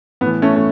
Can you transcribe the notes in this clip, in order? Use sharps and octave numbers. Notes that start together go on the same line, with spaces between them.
A2 E3 B3
A3 C#4
A3